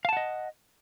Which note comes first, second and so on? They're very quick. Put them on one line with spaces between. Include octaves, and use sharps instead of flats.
F5 A5 F#5 D#5